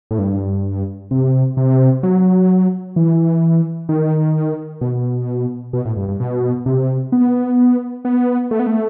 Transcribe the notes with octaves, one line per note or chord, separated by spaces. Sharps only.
A2
G2
C3
C3
F#3
E3
D#3
B2
B2
A2
G2
G2
B2
C3
B3
B3
A3
B3
A3